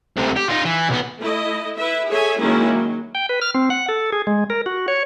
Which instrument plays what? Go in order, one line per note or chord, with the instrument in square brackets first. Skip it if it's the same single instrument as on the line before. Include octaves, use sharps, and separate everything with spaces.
[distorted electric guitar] D2 C3
G4
D#4 F4
E3
B1 B3
[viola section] A3 E4 D#5
E4 B4 E5
G#4 A4 C#5 E5 G#5
D#3 F#3 G#3 A#3 C#4 E4
F#3
[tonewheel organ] G5
B4
F6
C4
F#5
A4
G#4
G#3
A#4
F#4
C#5